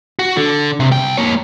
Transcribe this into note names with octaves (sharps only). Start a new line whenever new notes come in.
F#4
D3
C3
C2 G5
A#3 C#5